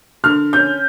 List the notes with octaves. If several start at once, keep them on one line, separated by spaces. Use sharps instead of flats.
D3 F6
C#4 G6